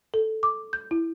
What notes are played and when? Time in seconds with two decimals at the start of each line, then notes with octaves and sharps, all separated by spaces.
0.14 A4
0.43 D6
0.73 G6
0.91 E4